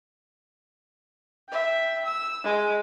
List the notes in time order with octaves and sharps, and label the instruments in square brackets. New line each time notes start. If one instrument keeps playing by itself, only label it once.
[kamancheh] E5 G5
E6
G#3